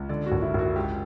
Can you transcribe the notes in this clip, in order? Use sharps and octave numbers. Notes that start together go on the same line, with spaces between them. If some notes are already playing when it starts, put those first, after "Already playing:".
Already playing: C#2
D3 D5
F#4
F#1
E4
F#1 F#4
C#2 G4